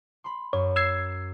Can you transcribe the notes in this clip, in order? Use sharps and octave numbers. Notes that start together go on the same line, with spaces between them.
B5 C6
F#2 C#5
E6 G#6 C7